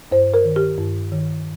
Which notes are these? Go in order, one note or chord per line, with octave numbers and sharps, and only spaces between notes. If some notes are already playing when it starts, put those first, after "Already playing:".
G2 C5
A#4
D#3
G4
G2
D#3